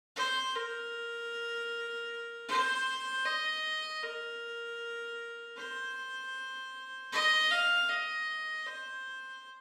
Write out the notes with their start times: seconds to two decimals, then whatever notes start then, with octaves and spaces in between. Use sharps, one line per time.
0.16 C5
0.55 A#4
2.48 C5
3.25 D#5
4.03 A#4
5.57 C5
7.12 D#5
7.51 F5
7.89 D#5
8.66 C5